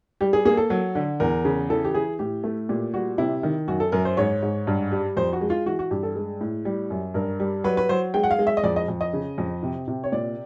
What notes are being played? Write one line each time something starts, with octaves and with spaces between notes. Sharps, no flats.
G3 G4
G#4
A#3 G#4
A4
F#3
D3
E2 A#4
C#3
E3 A4
G4
E3 G#4
A2 G4
A3
A#2 G4
G3 F#4
C3 E4
D#3
F#2 F#4
A4
F#2 A#4
C5
G#2 C#5
G#2
G2
G3
F2 C5
F#4
G#3
F4
E3 F#4
F#4
G2 G4
A4
G#3
A2
G3
F#2
G2 A#4
G3
F#3 B4
B4
F#3 C5
G#3 G5
F#5
F5
G#3
E5
D#5
F2 D5
D#5
F2
D#5
C#3
F2
C3
C3
C#5
A#2 D5